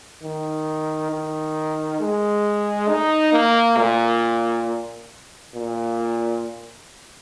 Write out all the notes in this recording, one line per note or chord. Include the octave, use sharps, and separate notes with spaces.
D#3
D#3
G#3
D#4
A#3
A#2
A#2